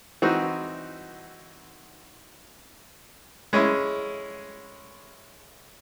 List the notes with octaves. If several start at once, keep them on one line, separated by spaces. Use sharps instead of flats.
E3 C4 D#4 F#4
G#3 C#4 E4